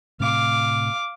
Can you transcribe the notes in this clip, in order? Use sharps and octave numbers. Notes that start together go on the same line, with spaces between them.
A2 C3 A3 F5 D6